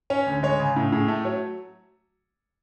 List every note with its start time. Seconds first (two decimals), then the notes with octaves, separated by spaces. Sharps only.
0.10 C#4 C#5
0.26 D2
0.43 G#3 C#5
0.59 C#3
0.76 A2
0.92 A2 G#4
1.08 A3 A4
1.24 F#3 C#5